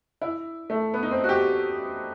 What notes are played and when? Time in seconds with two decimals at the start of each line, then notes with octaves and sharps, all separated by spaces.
0.22 E4
0.70 A3
0.94 B3
1.03 D#4
1.11 C4
1.24 F#4
1.29 G4